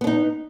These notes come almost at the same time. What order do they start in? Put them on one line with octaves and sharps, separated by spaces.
B3 D4 D#4